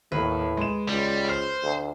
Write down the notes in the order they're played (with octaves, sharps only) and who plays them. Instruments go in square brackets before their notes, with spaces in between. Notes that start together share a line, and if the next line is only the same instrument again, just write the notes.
[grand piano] D#2 [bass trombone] A2 [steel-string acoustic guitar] B4
[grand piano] G#3 E7
[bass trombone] C#2 [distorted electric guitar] G3
[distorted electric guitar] C5 [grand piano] F6
[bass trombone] D2